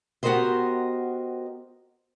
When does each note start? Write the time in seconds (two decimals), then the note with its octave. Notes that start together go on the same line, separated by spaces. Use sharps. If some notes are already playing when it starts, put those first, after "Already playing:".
0.23 B3 F#4 G4 A#4 C5 D#5